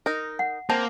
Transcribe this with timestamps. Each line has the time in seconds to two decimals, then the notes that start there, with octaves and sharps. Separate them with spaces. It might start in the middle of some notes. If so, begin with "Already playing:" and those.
0.06 D#4 A#4
0.39 F#5
0.70 A#3 C4 A5